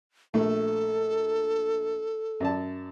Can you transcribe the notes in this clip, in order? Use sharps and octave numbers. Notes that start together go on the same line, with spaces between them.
A#1 A3 A4
F#2 D5 A5